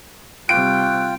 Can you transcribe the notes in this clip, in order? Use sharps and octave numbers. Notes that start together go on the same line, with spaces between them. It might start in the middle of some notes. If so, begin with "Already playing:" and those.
C3 G3 F4 G5 C#6 E6 F#6 D7